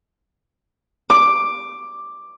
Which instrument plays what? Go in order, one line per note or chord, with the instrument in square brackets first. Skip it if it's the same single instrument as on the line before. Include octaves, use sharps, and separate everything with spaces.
[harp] D6